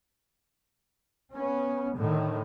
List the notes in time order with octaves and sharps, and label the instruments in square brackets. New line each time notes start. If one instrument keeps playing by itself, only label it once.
[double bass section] B3 C#4
A2 D3 D#3